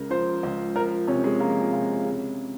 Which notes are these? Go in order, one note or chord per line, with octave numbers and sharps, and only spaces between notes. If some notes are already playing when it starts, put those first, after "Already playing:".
Already playing: C#2 C#3 A#4
F3 C5
C#2
F3 A#4
C3 C#4
G#3
F3 A#3
C3 A#3
C#3